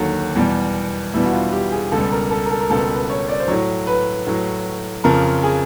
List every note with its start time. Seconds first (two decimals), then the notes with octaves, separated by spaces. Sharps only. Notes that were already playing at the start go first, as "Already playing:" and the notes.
Already playing: D#2 D3 F#3
0.35 E2 B2 G3
1.14 E2 B2 G3 E4
1.25 F#4
1.33 F4
1.53 G4
1.72 G#4
1.92 C#2 B2 G3 A4
2.12 A#4
2.31 A4
2.46 A#4
2.51 A4
2.60 A#4
2.70 C#2 B2 G3 A4
2.90 B4
3.10 C#5
3.28 D5
3.40 C5
3.48 A2 F#3 C#5
3.87 B4
4.27 A2 F#3
5.04 F2 C#3 F3 A#4
5.43 G#4